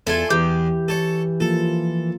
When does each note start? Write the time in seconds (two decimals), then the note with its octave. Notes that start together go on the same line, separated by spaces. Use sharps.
0.07 E2 E4 F4 A4 G#5
0.30 E2 E3 G4
0.88 A4 C#5
1.40 F3 A#3 F4 A4